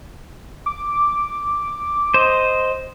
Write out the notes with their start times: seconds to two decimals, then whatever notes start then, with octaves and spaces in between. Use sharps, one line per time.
0.66 D6
2.14 C5 D#5